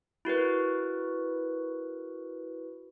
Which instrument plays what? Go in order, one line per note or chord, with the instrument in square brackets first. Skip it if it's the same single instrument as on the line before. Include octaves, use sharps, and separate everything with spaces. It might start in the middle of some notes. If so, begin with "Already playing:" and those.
[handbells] E4 F#4 A#4 B4